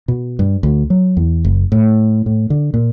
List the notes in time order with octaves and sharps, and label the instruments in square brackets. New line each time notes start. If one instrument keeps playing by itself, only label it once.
[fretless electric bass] B2
G2
D2
F#3
E2
F#1
A2
A2
D3
A#2